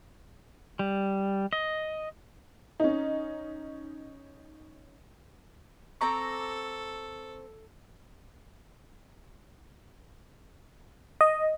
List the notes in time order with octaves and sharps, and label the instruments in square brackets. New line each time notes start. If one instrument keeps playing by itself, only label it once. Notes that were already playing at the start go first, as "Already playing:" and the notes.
[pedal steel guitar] G3
D#5
[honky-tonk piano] C#4 D#4
[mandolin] C4 A#5 D6 [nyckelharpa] A4 [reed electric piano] C#6
[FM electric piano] D#5